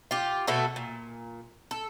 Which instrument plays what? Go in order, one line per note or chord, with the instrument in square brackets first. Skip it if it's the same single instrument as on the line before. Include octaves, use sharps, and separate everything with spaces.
[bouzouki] F4 G4
B2 A3 F#4 A4
A#2
A4